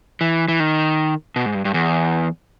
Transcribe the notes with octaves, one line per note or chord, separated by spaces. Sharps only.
E3
E3
D#3
B2
G#2
G2
G2
E2